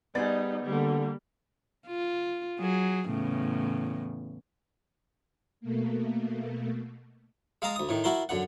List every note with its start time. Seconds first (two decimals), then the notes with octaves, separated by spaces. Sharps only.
0.15 G3 B3 D#4 G#4 C5 D5 A6
0.64 D3 G3 A#3
1.87 F4
2.60 F#3 G#4
3.09 E2 A2 C#3
5.61 B2 A3 A#3
7.62 G#3 F5 A5 A#5 D#6
7.76 D2 D#6
7.89 A2 D#3
8.04 E4 F#4 A#4 A5 C6
8.29 F#2 D3 F#5